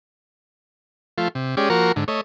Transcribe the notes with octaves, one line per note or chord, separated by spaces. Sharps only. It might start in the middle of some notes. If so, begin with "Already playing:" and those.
F3 A3 F4
C3
G#3 C#4 G4 D5
F3 A#3 F#4 A#4 C#6
G#2 D3
A3 C#5 D#5